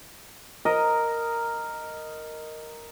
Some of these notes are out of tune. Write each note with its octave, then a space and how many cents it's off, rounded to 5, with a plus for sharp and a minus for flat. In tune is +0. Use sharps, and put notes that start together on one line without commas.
A#4 -5 D#5 +0